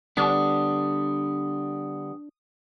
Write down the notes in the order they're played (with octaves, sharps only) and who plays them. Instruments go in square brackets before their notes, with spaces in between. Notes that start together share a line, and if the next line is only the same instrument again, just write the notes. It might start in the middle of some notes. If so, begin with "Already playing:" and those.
[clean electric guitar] D3 G3 B3 [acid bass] D4 [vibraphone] D#6